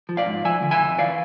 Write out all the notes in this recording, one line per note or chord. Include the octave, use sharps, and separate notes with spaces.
F3
D5 F5
G#2
F3 E5 G#5
D3
E5 G#5
F2
E3 D5 F5